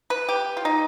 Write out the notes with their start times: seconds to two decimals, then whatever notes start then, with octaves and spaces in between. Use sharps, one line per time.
0.10 B4
0.29 G4
0.57 F4
0.65 D#4